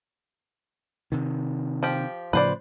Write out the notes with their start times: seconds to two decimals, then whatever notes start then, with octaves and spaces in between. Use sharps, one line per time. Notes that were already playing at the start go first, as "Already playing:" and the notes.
1.12 C3 D#3
1.83 F3 G4
2.33 A2 C#3 F3 B4 C5 D5